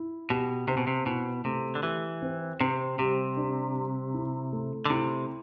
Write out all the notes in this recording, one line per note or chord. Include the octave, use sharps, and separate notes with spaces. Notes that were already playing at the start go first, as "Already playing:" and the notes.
Already playing: E4
B2 G4
C3 C4
B2
C3
B2 E4
C3 A3
D3
E3 G4
C4
C3 C4
C3 G3
D4
G3
E4
A3
D3
C3 E4